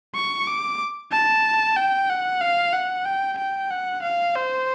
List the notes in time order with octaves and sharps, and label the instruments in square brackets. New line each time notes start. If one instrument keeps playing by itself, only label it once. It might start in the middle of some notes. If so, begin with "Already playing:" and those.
[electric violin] C#6
D6
A5
G5
F#5
F5
F#5
G5
G5
F#5
F5
C5